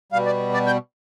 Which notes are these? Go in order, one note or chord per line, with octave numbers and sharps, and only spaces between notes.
B2 G3 F5
D5
D5
G5